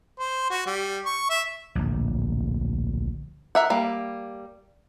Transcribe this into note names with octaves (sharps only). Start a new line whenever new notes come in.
C5
F#4
G3
C#6
E5
D1 A#1
A#4 E5 F#5
G3 A#3